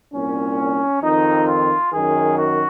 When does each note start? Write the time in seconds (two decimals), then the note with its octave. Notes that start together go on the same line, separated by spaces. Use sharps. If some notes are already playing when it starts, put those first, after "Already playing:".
0.13 C2 A#2 C#4
1.02 F2 D#3 D#4
1.47 F4
1.92 F#2 D#3 G#4
2.37 F#4